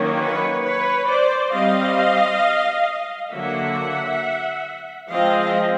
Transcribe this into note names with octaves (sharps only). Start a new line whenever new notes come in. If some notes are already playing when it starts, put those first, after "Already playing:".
Already playing: D#3 F#3 A#3 C#4
B4 C#5
B4 C#5
C5 D5
G3 C4 D#5 F5
D3 F#3 A#3 E5 F#5
F3 G#3 C4 D#5 F5